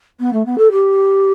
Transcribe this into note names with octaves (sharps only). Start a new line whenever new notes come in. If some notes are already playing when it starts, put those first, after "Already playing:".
B3
A3
B3
A4
G4